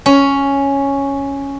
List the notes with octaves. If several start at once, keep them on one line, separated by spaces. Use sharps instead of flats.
C#4